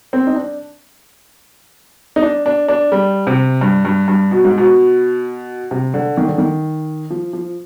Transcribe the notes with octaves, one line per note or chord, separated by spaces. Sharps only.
C4
D#4
D4
D#4
D4
D4
D4
G3
C3
G2
G2
G2
B2
G#2
B2
C3
D3
D#3
D3
D#3
F3
F3